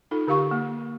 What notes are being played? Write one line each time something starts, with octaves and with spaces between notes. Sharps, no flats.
D#4 F4 A4
D3 G4 F5 C#6
A#3